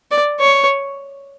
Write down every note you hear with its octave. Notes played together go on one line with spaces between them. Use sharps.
D5
C#5